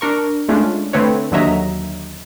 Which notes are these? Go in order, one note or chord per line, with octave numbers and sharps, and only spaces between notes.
D4 A#4 C#6
G#3 A3 C#4 D4 F4
D3 A3 C4 B4 C#5
D#2 D3 F#3 D#5 E5 A#5